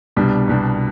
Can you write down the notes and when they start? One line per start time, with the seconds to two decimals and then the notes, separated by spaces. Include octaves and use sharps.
0.17 C2 B2 G3 D4
0.47 C2 B2 G3 D4